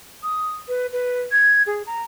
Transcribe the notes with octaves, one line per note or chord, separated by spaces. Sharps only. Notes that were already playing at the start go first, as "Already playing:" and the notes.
D#6
B4
B4
G#6
G#4
A#5